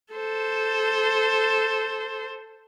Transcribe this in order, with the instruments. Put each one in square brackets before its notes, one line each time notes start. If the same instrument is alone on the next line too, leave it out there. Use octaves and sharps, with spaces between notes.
[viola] A4 C5